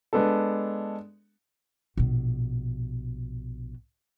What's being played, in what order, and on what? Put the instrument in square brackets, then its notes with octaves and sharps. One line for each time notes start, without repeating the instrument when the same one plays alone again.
[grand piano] G#3 B3 D4 A4
[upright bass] A#1 B2